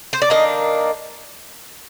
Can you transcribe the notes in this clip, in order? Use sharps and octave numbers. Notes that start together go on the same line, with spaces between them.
C5
D5
D#3 A#3 D4 D#5